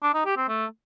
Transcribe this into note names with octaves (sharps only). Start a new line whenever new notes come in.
D4
D#4
G4
C4
A3